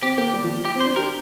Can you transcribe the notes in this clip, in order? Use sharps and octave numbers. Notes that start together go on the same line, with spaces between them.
C4 G4
A#3 G4
G3
F3
G4
C4
C5
D4
G4 A#4